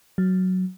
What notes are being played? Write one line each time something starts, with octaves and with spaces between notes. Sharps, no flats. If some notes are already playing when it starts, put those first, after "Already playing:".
F#3